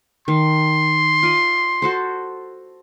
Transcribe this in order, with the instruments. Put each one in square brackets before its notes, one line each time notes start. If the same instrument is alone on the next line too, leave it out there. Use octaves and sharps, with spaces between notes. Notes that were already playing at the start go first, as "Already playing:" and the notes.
[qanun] D#3 [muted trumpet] C6
[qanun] F4 D5 D#5
F#4 A4 C5